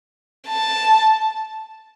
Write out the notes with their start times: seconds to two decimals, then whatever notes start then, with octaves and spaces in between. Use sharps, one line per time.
0.48 A5